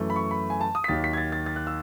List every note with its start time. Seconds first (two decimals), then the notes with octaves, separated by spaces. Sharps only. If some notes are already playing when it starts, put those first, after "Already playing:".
Already playing: F#2 E3 A3
0.10 B5
0.16 C#6
0.31 B5
0.50 G#5
0.61 A5
0.75 D#6
0.84 B6
0.88 D#2 D#3 F#3 A6
1.04 B6
1.13 G#6
1.17 A6
1.32 A6
1.46 A6
1.56 F#6
1.67 E6